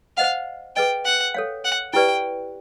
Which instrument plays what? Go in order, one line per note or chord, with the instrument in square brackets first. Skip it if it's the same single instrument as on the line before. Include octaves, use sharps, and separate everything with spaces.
[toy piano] C5 D#5 F#5 [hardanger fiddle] F5
[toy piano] G#4 B4 D#5 [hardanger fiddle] G5
[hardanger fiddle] F#5
[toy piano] A4 C#5 F5
[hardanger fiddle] F#5
[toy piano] E4 G4 B4 D5 [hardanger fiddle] G5